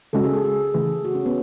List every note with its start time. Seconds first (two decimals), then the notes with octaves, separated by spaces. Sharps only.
0.13 C#3 G#3 C#4 F#4 A4
0.24 G#4
0.34 A4
0.44 G#4
0.74 C#3 E3 A3
1.05 F#4
1.15 C#4
1.26 B3